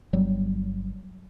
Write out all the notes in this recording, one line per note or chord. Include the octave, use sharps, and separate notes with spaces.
G1 F#3 G3